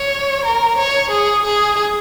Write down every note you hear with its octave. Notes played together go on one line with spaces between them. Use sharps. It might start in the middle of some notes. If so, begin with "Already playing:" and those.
Already playing: C#5
A#4
C#5
G#4
G#4